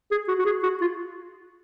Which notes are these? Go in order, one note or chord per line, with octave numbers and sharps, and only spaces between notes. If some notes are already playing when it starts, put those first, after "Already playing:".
G#4
F#4
F#4
G#4
F#4
F4